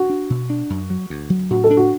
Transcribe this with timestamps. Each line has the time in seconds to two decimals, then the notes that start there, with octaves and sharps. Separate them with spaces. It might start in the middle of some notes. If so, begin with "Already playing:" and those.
Already playing: F#4
0.10 D4
0.30 B2
0.50 D4
0.70 F#2
0.90 F#3
1.10 D2
1.30 F#3
1.50 A2 F#4
1.64 A4
1.71 D4
1.77 F#4